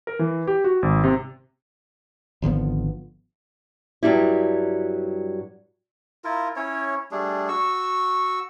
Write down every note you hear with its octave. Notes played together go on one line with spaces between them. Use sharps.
A#4
E3
G4
F#4
G#1
C3
G#1 D3 F3 B3
G2 F#3 G3 E4
E4 F4 A#4
C#4 E4 C#5
G3 A3 D4 G#4
F#4 C#6 E6